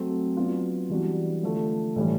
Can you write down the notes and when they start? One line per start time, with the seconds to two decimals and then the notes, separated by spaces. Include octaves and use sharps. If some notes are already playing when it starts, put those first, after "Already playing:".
Already playing: F#3 A3 C4
0.37 F#3 B3 D4 F4
0.90 E3 G3 B3 D4 F#4
1.43 D3 F3 A3
1.96 A2 E3 G3